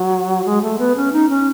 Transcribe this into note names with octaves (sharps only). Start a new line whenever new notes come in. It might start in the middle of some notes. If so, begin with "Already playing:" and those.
Already playing: F#3
G#3
A3
B3
C#4
D#4
C#4